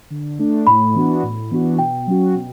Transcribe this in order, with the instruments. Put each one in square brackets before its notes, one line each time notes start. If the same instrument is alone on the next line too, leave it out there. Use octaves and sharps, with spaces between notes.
[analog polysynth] D3
A3 D4
[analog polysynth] A2 [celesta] B5
[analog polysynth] E3 B3 D4 F#4
A2
E3 B3 D4 F#4
[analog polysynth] B2 [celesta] G5
[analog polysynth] F#3 C#4 F#4
B2